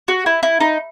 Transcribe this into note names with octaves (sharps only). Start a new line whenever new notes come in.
F#4
E4
E4
D#4